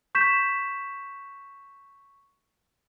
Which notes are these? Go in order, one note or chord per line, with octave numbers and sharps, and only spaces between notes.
C#6 G6 B6 E7